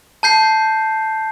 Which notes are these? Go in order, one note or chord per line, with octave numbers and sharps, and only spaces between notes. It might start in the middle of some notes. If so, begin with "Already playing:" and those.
A5 G6 C7